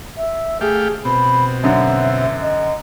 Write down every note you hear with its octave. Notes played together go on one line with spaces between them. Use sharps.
E5
A3 G4 G#4 F5
B2 C4 B5
F#2 D3 E5
D#5